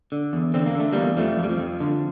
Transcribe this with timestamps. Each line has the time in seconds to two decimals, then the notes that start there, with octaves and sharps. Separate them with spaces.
0.12 D3
0.33 E2
0.54 D3 C4
0.66 A#3
0.75 D3 A3
0.92 E2 G3 A#3
1.17 F2 F3 A3
1.39 F2 G3
1.50 F3
1.59 F2
1.80 D3